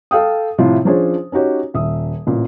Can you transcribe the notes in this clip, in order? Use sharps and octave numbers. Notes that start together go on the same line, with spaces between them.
A4 F5 G5 D#6
A2 C3 F3 F4
F3 C#4 D4 G#4 C5 C#5
C#4 D#4 F#4 G4 C#5
D#1 E5 D#6
A1 A#2